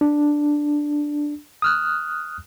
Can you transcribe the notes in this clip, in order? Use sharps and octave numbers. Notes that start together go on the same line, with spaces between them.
D4
D#6 F6 F#6